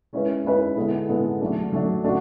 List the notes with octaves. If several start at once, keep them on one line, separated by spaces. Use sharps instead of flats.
G#3 C#4 E4 B4
G#3 C#4 E4 B4
D3 G#3 B3 E4 A4
D3 G#3 B3 E4 A4
F#3 A3 D4
F#3 A3 D4
D3 A3 D4 F#4